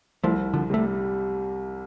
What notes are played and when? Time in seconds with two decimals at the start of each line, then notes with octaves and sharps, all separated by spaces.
0.24 C2 F3 A3
0.54 D3 F3
0.70 C3 G3 A3